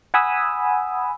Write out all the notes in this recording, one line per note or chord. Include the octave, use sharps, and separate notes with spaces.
F#5 G#5 B5 D#6 E6